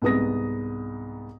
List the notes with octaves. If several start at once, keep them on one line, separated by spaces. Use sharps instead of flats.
C2 G#2 B3 D#6 A#6